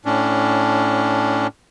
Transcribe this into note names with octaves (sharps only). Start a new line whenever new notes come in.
A2 C#4 D4